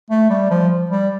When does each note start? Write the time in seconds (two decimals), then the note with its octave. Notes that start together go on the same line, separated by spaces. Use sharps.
0.10 A3
0.30 G3
0.50 F3
0.91 G3